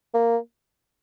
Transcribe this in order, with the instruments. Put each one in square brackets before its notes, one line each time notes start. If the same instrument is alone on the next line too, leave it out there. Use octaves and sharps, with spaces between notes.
[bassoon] A#3